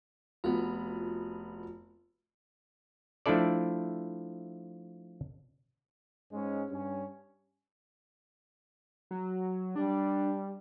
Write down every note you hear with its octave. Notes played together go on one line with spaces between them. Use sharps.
F1 B3 F4 F#4
F3 A3 D4 E4 A4 D5
G#2 G#3 C#4
G2 C#4
F#3
G3 D4